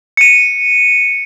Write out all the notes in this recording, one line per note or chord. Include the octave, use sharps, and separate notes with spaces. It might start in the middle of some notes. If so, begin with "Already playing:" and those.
C#7 D#7